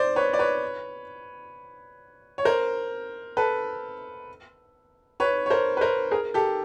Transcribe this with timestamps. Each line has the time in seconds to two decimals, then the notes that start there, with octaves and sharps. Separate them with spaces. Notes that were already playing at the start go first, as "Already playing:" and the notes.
Already playing: C5 D5
0.16 B4 C#5
0.33 D5
0.39 B4 C#5
2.38 C#5
2.45 A#4 C5
3.37 A4 B4
5.20 B4 C#5
5.46 C#5
5.50 A#4 C5
5.77 B4
5.81 A#4 C5
6.11 G#4 A#4
6.34 G4 A4